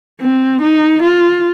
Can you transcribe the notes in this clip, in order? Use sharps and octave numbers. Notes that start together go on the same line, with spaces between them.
C4
D#4
F4